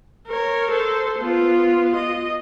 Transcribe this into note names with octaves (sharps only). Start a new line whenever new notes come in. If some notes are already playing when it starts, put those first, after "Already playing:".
A#4 C#5
A4 C5
B3 F4
D#5